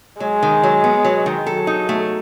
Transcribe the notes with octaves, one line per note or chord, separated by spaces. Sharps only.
F#3 G#3
D#3
F#3
B3
F#3
D#3
F#3 A4
D#4
A3